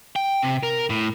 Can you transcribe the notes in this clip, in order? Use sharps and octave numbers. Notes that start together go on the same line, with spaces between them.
G5
C3
A#4
A2